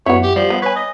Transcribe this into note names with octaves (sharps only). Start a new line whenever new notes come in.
F#2 B3 E4 F#4 C#5
G4
F3 G3
B3 D#6
B4 C#5 G#5
D#5